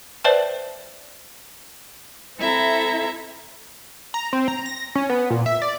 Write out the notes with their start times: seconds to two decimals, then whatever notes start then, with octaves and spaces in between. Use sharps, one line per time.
0.24 B4 C5 D5 E5 G5 A5
2.38 C4 E4 A4 E5 A#5
4.14 A#5
4.33 C4
4.48 A#5
4.66 A#6
4.95 C#4
5.10 B3
5.30 A#2
5.46 E5
5.62 D5